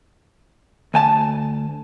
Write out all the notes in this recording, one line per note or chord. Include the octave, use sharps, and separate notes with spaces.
D2 G#5 A5